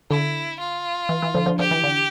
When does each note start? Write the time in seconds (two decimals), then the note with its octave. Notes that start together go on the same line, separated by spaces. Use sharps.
0.11 D3 E4
0.60 F4
1.09 E3
1.22 E3
1.34 D3 F3
1.46 D3 F3
1.59 D3 F3 G4
1.71 E3
1.84 D3